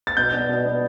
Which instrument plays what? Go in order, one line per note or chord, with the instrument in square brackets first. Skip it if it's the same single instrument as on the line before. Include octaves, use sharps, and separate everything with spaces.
[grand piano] A6
[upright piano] B2 [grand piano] G6
[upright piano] B3 D4
B2
B3 D4